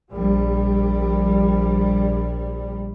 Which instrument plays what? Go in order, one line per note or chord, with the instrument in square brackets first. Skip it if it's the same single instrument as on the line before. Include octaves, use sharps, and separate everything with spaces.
[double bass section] A#1 G3